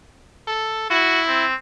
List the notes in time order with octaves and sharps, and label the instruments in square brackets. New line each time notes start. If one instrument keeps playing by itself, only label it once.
[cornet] A4
[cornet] E4 [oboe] F#4
[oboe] C4